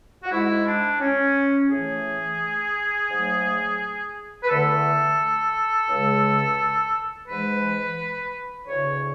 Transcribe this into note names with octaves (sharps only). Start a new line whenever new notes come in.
F#4
G#2 G#3 E4
D4
C#4
A2 E3 A3 G#4
G#2 F#3 A3
B4
E2 D3 A3 A4
C#2 C#3 G#3
G#2 E3 G#3 B4
D2 C#3 E3 C#5